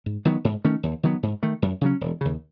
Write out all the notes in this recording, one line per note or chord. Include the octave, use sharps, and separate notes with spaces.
G#2
D#3 F#3 B3
G#2
D#3 A3 C#4
D#2
D#3 F#3 B3
G#2
D#3 A3
F#2
C#3 F#3 C#4
E1
D#2 C#3